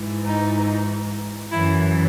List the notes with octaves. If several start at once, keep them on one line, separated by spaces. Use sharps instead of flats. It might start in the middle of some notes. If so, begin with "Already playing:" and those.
Already playing: G#2 E3
D#4
F#2 E3 E4